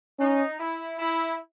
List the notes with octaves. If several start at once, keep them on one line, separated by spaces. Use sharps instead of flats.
C#4 D#4
E4
E4